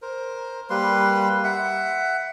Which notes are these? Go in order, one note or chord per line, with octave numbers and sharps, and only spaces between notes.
A#4 C5
G3 A#3 B4 C6
E5 F#5